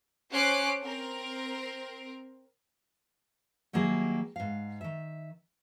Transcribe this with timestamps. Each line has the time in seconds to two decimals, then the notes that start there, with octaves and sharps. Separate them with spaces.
0.33 C#4 C5 D6 F#6 C7
0.81 C4 A#4
3.73 D#3 F#3 G3 A#3 E4 G#4
4.36 G#2 F5
4.81 D#3 E5